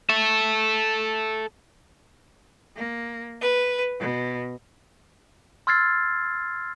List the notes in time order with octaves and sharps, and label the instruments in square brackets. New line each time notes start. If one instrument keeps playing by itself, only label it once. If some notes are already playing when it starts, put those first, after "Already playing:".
[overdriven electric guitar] A4 E5
[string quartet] A#3
B4
B2
[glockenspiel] C6 E6 F6 G#6 A6 C7